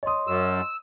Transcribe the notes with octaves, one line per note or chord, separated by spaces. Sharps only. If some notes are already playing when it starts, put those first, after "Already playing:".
C#5 D#5 C6 D#6
F#2 E6